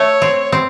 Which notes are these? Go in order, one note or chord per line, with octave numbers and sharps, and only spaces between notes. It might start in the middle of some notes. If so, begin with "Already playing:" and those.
Already playing: A3 C#5
C4
C4